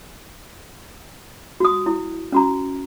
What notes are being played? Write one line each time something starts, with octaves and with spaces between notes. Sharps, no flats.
F#4 D#6
E4
C#4 F#4 A#5